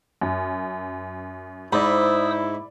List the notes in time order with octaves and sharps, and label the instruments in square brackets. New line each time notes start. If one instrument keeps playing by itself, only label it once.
[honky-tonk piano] F#2
[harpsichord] G#2 [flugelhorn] E4 [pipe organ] C5 D#6 E6 [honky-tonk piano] D5 B5